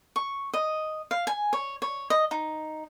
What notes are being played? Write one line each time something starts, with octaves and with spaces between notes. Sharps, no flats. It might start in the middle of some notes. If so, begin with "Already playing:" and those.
C#6
D#5
F5
G#5
C#5
C#5
D#5
D#4